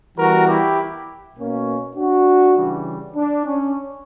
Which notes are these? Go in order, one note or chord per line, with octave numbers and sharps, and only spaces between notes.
E3 G3 B3 F#4 A#4
E4 G4
B2 A#3 C#4
D4 F#4
C#3 E3 G3
D4
C#4